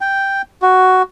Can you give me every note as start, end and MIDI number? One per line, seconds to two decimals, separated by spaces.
0.01 0.42 79
0.62 1.02 66